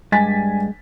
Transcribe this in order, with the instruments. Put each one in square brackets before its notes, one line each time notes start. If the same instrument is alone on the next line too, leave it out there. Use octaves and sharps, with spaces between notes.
[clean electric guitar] G2 [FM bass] G#3 [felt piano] G#5 A6 B6